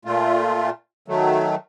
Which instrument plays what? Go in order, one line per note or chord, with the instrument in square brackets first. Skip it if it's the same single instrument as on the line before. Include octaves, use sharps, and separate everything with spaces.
[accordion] A#2 A3 F4
D#3 F#3 A3